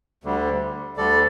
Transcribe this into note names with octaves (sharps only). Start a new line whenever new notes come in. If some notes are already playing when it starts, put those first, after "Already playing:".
D2 D3 G3
D2 D3 G3 A4 D5